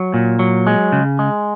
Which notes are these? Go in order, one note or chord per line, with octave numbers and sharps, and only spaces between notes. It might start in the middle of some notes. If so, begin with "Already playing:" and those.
Already playing: F#3
A#2
F#3
G#3
C#3
G#3